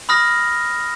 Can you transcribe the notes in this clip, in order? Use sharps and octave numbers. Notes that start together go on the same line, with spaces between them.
B5 D#6 F6 A#6